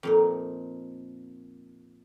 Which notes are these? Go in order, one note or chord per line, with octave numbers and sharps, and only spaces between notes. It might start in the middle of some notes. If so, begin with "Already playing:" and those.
F2 A#2 D#4